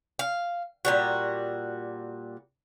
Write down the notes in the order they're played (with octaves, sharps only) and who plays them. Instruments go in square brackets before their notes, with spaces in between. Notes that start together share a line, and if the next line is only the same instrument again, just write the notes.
[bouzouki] F5
A#2 G3 F#4